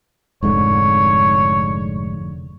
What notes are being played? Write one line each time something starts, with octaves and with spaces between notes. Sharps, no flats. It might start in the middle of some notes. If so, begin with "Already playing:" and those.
F1 G#2 D3 C#5